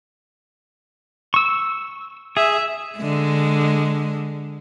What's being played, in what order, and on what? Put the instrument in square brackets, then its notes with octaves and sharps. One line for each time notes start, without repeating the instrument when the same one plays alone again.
[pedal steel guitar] C#6 E6
[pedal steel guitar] G#4 [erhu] E5
[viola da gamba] D3 G#3